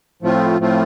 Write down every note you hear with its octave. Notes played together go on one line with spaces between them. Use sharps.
A2 F3 A3 C4 F4
A2 F3 A3 C4 F4